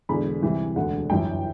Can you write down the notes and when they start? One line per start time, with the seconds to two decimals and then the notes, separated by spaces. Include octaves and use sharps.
0.09 E1 E2 D3 B5
0.42 C2 C3 E3
0.76 E1 D2 D3 F#5
1.09 G1 F#2 E3 G5